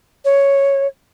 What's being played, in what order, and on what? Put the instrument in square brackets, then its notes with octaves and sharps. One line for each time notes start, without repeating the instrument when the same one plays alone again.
[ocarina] C#5